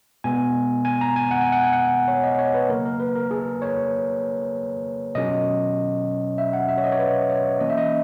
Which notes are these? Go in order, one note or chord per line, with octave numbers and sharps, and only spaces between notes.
B2 G#3 B3 G#5
G#5
A#5
G#5
F#5
G#5
F#5
G#5
F#5
C#5
D#5
C#5
B4
C#3 F#3 A#3 A#4
A#4
B4
A#4
G#4
C#5
B2 F#3 C#4 D#5
E5
F#5
E5
C#5
D#5
C#5
B4
C#5
E3 A#3 C#4 D#5
E5
D#5